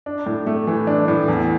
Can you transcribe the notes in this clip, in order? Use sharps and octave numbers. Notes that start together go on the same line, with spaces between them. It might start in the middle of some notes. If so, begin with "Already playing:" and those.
D4
A2
A3
E3
D4
A2
E2